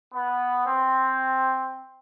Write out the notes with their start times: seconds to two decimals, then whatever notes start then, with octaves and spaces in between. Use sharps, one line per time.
0.13 B3
0.67 C4